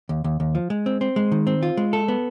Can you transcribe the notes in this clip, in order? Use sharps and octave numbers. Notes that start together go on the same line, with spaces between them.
D#2
D#2
D#2
F3
G#3
C4
C4
G#3
D#3
C4
F4
G#3
A4
B3